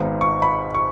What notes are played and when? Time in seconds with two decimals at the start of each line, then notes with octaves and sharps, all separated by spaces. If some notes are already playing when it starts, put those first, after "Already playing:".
Already playing: G#1 G#2 G#3 B3 D#4
0.21 C#6
0.42 B5
0.75 C#6